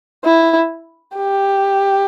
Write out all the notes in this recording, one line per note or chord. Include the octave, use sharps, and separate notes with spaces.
E4
G4